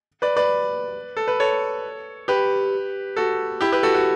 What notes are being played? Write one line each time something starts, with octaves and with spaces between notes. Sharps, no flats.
B4 D5
B4 D5
A4
B4
A4 C#5
G4 B4
F#4 A4
E4 G4
G4 B4
F#4 A4
F#4